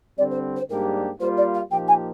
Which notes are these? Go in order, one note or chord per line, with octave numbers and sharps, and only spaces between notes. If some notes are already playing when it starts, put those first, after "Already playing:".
D3 G3 C4 D5
C5
C5
G#2 G3 A#3 D4 G4 A#4
G3 A#3 F4 C5
D5
F5
A#2 F3 A#3 D#4 G4 G5
G#5